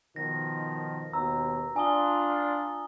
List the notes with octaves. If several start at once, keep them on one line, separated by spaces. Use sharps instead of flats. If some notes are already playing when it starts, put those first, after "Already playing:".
B2 D#3 F3 A#6
D#2 B2 A#5 E6
D4 F4 G#5 D#6 G7